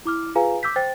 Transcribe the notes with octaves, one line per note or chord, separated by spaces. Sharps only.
E4 D6 F6
F4 G#4 B4 F5 G#5 A#5
D6 E6 G6 B6
C5 G5 A6